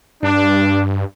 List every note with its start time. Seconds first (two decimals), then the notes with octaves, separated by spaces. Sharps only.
0.23 G2 D4